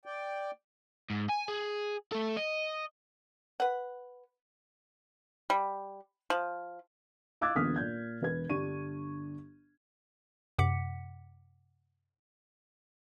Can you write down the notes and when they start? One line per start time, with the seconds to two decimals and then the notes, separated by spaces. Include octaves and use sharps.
0.06 D5 G5
1.10 G#2
1.29 G#5
1.48 G#4
2.12 A3 A4
2.37 D#5
3.60 B4 F#5
5.50 G3
6.30 F3
7.41 F5 D6 E6 F#6 G#6 A6
7.55 D#1 A#1 B3 D#6 F6 B6
7.76 A#2 G6 G#6
8.21 E1 B4 G#6
8.49 G1 D4 G4 C#6 D#7
10.59 F#2 C3 F#5 D6 B6 C#7